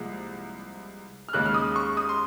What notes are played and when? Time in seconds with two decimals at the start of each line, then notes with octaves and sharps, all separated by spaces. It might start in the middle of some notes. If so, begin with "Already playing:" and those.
Already playing: C2 A#2 F3 G#3
1.28 F6
1.33 D#2 C#3 G#3 F#6
1.46 F6
1.54 D#6
1.76 C#6
1.97 D#6
2.09 C6